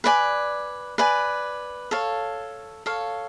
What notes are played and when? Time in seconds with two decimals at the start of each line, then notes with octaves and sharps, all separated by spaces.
0.04 B4 D5 G#5
0.98 B4 D5 G#5
1.91 A4 C#5 F5
2.86 A4 C#5 F5